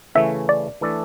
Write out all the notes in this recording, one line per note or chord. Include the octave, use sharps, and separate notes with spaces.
C#3 E3 A3 C#4 E5
D5
E3 A3 D4 A4 D5